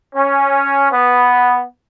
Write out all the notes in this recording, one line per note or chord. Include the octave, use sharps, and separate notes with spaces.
C#4
B3